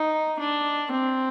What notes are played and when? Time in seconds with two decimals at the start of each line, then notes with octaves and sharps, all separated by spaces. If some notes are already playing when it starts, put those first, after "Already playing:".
Already playing: D#4
0.39 D4
0.91 C4